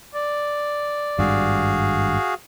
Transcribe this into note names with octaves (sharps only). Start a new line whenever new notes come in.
D5
G#1 G2 F#4 G#4 F5